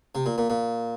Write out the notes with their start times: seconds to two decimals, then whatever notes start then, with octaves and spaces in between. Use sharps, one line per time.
0.15 C3
0.26 A#2
0.38 A#2
0.50 A#2